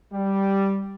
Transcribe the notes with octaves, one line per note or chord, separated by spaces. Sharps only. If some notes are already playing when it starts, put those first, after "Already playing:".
G3